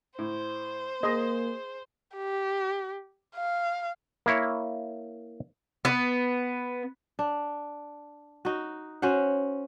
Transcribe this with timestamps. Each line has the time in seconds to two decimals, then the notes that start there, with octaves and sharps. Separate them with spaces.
0.19 A2 C5
1.03 A#3 G#4 D#5 C6
2.15 G4
3.35 F5
4.26 A#3 E4 C#5
5.85 B3
7.19 D4
8.45 D#4 F#4
9.02 C#4 F#4 C5 F#5